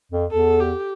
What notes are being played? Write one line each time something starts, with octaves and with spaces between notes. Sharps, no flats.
F2
E2 A4
G4